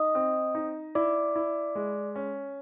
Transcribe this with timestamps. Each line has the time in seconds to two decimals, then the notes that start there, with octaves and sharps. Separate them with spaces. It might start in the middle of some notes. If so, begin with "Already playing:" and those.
Already playing: D#4 D#5 D#6
0.15 C4
0.55 D#4
0.95 E4 D5 D6
1.36 E4
1.75 G#3
2.16 C#4